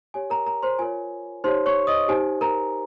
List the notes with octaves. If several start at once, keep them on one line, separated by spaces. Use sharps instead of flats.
G4 C#5 G#5
A#4 A#5
A#4 A#5
C5 C6
F4 A#4 C#5 G#5
D#4 G4 C5 C#5 C6
C#5 C#6
D#5 D#6
D#4 G4 C5 G#5
A#4 A#5